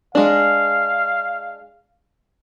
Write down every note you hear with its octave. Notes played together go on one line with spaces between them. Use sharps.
G#3 D4 F5